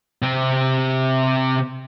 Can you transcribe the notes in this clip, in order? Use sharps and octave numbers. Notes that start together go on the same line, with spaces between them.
C3 C4